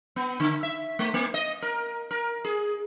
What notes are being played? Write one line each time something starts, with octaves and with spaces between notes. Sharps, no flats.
B3
D3
E5
A3
A#3
D#5
A#4
A#4
G#4